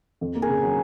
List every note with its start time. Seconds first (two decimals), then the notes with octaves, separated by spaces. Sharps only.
0.21 F2
0.35 A#3
0.42 G#4 A#4
0.49 C#3
0.63 F#3